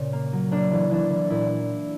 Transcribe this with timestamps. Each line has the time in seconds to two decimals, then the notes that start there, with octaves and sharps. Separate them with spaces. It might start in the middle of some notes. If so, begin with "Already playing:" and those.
Already playing: A#2 C#3 C#4
0.13 A#3
0.33 F#3
0.51 A#3 D4
0.72 E3
0.91 E3 D4
1.10 E3
1.30 A#2 E4